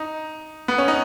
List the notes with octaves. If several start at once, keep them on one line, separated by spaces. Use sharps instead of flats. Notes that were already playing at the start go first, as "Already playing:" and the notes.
Already playing: D#4
B3
C#4
D#4